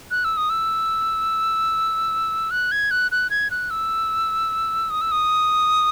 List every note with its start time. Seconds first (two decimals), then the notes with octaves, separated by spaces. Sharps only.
0.11 F#6
0.24 E6
0.37 D#6
0.50 E6
2.51 F#6
2.72 G#6
2.91 F#6
3.11 F#6
3.30 G#6
3.51 F#6
3.70 E6
4.90 D#6
5.01 E6
5.12 D#6